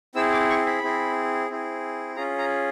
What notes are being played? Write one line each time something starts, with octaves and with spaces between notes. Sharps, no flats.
C4 E4 G#4 E6
D6
C#6
B5
C4 E4 G#4
C4 E4 G#4
C#4 F4 G#4 A#5
A#5